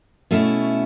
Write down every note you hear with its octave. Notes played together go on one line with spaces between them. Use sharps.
B2 A3 C#4 E4